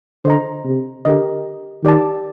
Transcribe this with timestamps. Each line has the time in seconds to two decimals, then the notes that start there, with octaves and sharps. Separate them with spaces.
0.25 D3 C5 D#5 A#5
0.65 C3
1.05 D3 G4 A#4 D#5
1.83 D#3 G4 D5 A5